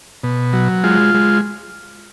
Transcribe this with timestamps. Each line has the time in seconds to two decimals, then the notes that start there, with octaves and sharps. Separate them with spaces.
0.24 B2
0.53 F#3
0.84 G#3 F4
1.15 G#3